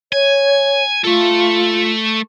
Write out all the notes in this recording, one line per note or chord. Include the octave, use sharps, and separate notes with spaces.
C#5 G#5
A3 F4 A4